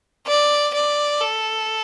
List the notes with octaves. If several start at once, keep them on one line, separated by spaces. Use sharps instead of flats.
D5
D5
A4